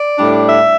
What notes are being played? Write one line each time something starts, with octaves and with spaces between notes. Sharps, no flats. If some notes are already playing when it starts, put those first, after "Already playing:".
Already playing: D5
A2 G3 D4
E5